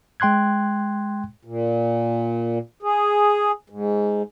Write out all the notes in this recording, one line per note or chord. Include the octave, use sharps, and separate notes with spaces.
G#3 G5 C6 F#6 G#6
A#2
G#4
G#2